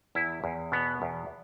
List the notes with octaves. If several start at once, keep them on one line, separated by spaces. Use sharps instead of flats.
E2 E4
E2
B2 B3
E2